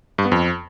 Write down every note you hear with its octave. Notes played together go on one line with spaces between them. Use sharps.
G2
B3
F2